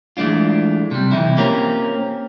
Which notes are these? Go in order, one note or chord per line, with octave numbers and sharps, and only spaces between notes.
E3 G#3 A3 D4 F4
C3 G3
C3 E3 D#4 E4
A#3 C4 C#4 F4 G4 A#4